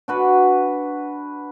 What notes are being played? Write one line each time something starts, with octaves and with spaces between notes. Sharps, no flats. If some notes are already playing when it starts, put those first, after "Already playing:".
D4 F#4 B4